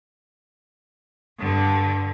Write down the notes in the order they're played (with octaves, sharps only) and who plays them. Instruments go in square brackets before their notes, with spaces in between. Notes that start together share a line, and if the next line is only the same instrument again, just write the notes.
[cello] G2 D3